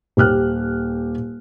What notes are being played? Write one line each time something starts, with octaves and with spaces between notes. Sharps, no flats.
D#1 G4 F6 F#6